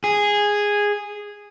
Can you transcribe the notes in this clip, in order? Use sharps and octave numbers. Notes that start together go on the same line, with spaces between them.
G#4